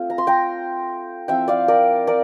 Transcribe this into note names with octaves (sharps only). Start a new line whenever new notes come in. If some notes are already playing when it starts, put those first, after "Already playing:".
Already playing: A3 C4 F4
A#5
C6
G5 A#5
F3 C4 E4 E5 G5
D5 F5
A#4 D5
A#4 D5